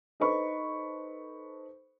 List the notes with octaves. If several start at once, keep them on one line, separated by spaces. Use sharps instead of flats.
D#4 A4 B4 C5 B5 C#6